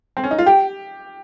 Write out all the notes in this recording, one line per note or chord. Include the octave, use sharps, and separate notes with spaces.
C4
C#4
D#4
F4
G4 G5